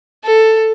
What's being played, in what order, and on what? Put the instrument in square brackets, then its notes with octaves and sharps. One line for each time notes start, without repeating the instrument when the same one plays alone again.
[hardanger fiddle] A4